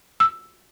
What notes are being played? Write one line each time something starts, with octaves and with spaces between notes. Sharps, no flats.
E6